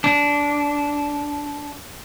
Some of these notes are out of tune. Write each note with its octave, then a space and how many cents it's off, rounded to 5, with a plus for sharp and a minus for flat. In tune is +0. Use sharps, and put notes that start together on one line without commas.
D4 -15